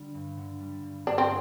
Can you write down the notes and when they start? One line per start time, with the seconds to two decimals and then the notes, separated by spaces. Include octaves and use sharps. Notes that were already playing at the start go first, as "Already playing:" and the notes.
Already playing: D3 G3
0.14 G2
0.37 D3
0.60 G3
0.83 G2
1.07 G2 D4
1.18 C4